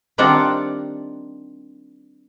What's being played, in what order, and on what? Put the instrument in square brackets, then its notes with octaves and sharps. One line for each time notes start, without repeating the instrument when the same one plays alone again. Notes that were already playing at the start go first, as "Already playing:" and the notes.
[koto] D#3 G3 C4 D4 F4 F#5